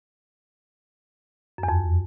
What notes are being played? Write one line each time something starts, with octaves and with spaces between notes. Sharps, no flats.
F#2
E2
F2